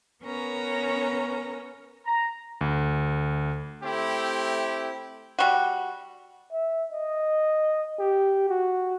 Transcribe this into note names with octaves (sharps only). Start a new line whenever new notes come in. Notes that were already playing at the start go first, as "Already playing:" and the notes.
B3 C#4 A#4 C#5 A#5
A#5
D2
A3 C4 E4 G4
G3 F#4
E5
D#5
G4
F#4